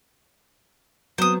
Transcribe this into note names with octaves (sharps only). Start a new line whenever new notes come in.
F#3 B3 C4 C5 D#6